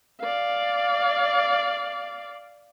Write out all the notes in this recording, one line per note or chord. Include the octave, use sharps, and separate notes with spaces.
D5 F5